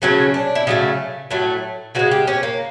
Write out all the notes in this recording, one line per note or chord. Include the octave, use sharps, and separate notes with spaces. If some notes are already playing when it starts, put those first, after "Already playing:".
C#3 F#3 A3 C#4
D4
E4
C#3 F#3 A3 D#4
A2 F#3 A3
C#3 F3 G#3 F#4
G4
C#4
A#3